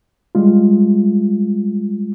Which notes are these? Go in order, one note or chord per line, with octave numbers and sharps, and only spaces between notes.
G3 G#3 F4